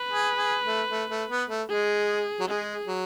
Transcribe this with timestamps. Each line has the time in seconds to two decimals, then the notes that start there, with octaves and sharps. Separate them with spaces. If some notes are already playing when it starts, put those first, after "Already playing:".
Already playing: B4
0.12 G#4
0.38 G#4
0.64 A3
0.90 A3
1.10 A3
1.30 B3
1.49 A3
1.69 G#3 G#4
2.40 F#3
2.48 G#3 G#4
2.87 F#3